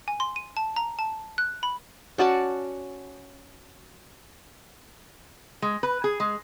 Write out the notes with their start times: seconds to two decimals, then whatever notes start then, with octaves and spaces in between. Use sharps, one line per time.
0.08 G#5
0.20 C6
0.36 D#7
0.57 A5
0.76 A#5
0.99 A5
1.38 F#6
1.63 B5
2.18 C#4 F#4 D5 A5
5.62 G#3
5.83 B4
6.04 G#4
6.20 G#3